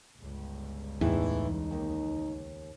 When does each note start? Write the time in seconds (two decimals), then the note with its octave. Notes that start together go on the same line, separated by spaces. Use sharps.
0.18 G1 C#2
1.01 E2 A2 E3 D#4 E4
1.71 D#2